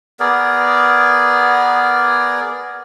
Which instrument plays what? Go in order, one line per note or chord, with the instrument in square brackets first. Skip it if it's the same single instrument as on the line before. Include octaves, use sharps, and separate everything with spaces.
[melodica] B3 G#4 A#4 D5